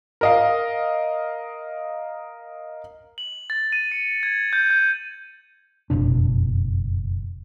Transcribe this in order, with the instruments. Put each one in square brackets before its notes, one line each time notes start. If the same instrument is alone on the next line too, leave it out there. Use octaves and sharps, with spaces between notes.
[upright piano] A#4 D#5 F5
[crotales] F#7
A6
D#7
C#7
G#6
G6
G6
[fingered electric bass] F#1 F2 B2 D4